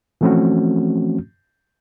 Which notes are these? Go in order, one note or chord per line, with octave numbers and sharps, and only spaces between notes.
E3 F3 A3 C4 C#4 F#4